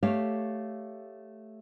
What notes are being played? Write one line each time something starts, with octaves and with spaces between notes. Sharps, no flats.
A3 G4 C#5 F5